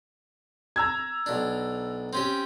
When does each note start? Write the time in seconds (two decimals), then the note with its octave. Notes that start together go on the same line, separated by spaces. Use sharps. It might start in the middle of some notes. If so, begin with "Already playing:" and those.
0.76 A#5 E6 G#6
1.26 B1 D4
2.13 C4 C#4 G4